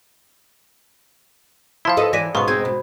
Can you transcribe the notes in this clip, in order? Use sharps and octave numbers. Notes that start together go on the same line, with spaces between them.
F3 E4 F5 A5 C6
A4 B4 D#5
E3 D5 A#6 B6 D#7
B1 G#2 C#3 B3 C6 C#6
G#3 C4 D#4 G#6
B2